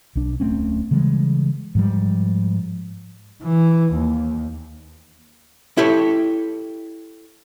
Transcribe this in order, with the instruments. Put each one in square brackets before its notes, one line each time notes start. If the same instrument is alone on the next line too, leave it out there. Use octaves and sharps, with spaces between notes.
[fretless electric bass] B1 D4
D1 A3 C4 C#4
C#3 E3 G3 G#3
G#2 F3 G3
[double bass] E3
D#2
[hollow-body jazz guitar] E4 G4 A4 C#5